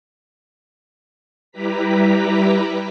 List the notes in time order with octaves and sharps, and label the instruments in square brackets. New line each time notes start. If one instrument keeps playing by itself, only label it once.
[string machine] G3 E4 G4 B4 A#5 B6